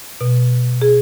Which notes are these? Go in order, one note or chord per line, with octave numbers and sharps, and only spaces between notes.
B2
G#4